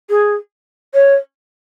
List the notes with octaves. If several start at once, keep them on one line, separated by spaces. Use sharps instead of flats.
G#4
C#5